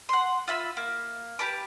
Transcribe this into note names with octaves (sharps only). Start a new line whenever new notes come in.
F#5 C6
F4 E5 B5 E6
A#3
G4 B4 A5 D6